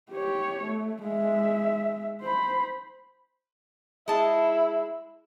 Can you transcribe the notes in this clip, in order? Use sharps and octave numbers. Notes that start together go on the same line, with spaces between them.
G4 C#5
A3
G#3 E5
C5 B5
G#3 E4 A5